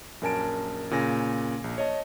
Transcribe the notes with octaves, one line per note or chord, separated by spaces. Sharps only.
A#1 F#2 A#4 G#5 A5 D7
A#2 C#3 G#5 A#6
A#1
C#5 D#5 A5